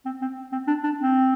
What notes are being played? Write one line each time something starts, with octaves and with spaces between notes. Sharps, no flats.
C4
C4
C4
D4
D4
C4